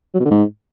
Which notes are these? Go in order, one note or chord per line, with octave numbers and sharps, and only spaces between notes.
F#3
B2
D3
G#2